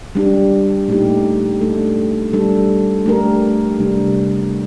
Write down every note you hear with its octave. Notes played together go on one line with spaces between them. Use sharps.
G3 D4 G4
A#2 A3 D#4 G4
A3 D4 A4
G3 D4 A4
A3 D4 G4 A#4
C3 G3 D4